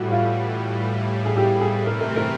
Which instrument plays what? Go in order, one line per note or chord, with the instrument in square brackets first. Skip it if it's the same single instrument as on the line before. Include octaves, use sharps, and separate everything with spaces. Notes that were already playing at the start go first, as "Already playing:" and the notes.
Already playing: [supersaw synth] A2 E3 G3 [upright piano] F#4
[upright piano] F4
G#4
G4
G#4
[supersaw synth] C3 E3 A3 C4 [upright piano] A#4
[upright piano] A#4
A#4